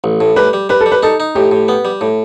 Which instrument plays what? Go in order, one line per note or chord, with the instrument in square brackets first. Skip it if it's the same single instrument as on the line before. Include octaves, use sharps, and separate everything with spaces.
[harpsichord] A1
A2
[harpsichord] G3 [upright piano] B4
[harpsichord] G3
[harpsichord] G3 [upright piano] B4
[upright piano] A4
[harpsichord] G3
[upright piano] B4
[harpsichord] D#4 [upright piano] A4
[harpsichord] D#4
[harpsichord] A2 [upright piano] G4
[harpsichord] A2
B3
G3
A2